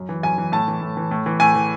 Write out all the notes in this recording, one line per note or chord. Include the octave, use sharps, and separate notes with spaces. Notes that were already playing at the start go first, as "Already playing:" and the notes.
Already playing: F#2
E3
F#2 G#5
E3
A2 A5
E3
A2
E3
A2
E3
A2 G#5
E3